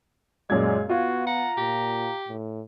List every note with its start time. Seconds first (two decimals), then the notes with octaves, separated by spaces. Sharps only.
0.50 F#2 A#2 G#3 D5 G#6
0.89 B3 F4 F#4
1.27 F#5 A#5
1.57 A#2 G4
2.28 A2